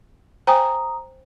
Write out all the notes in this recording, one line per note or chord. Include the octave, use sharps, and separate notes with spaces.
C5 G5 G#5 A#5 D#6